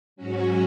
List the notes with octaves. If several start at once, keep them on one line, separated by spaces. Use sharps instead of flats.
G#2 F#3 C#4 F#4